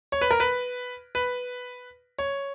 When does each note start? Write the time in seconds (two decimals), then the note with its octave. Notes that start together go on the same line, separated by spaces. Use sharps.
0.12 C#5
0.21 B4
0.31 A#4
0.40 B4
1.15 B4
2.19 C#5